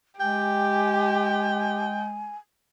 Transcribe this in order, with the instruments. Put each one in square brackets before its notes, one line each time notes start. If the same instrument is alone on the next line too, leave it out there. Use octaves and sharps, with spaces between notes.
[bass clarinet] G#3 [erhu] G4 [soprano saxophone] G5 [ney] G#5